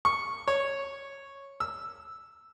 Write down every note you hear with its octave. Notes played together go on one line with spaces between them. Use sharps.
C#6
C#5
E6